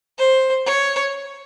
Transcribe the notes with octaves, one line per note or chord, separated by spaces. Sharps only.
C5
C#5